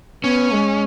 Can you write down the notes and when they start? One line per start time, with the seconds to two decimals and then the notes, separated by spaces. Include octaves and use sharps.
0.24 B3 C#4
0.52 G#3